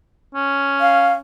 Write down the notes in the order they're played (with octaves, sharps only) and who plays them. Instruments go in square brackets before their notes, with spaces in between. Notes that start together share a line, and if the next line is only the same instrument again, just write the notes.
[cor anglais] C#4
[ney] F5